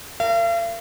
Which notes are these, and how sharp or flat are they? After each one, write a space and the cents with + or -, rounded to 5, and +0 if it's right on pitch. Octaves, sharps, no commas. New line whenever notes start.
A#4 -25 F5 -45